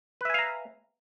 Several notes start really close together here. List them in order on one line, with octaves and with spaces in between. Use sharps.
B4 E5 G#5 F5 A#5